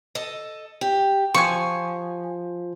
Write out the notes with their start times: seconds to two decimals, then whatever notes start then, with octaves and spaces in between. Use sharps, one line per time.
0.15 A4 D#5
0.81 G4
1.34 F3 G#5 C#6